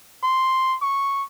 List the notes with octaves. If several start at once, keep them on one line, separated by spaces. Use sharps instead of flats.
C6
C#6